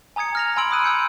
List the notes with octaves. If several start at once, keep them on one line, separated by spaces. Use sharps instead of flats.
G#5 A#5 D#6 G#6 C#7
F6 A#6 F7
G#5 B5 C6 E6 D7 F#7
B5 D#6 F#6 D#7
E6 G6 C#7